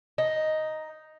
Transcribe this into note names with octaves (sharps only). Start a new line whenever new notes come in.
D#4